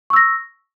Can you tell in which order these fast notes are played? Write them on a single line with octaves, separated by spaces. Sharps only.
C#6 E6 A#6